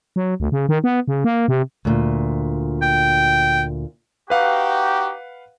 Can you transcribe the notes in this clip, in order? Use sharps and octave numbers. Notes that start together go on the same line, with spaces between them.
F#3
D2
C#3
D#3
B3
C#3
A#3
C3
D2 A#2
G5
D#4 F#4 G4 B4 F5 F#5